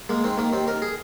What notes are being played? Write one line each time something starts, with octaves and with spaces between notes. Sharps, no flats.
G#3 A#3
D#3 C4
D#3 A#3
D#2 C4
D#2 A#4
G#4